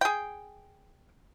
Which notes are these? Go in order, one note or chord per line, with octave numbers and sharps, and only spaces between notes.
G#4 G5